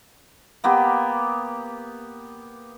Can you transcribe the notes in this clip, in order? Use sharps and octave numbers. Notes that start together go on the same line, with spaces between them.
A#3 B3 G4